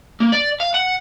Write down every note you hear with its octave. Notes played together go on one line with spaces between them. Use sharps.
A#3
D5
F5
F#5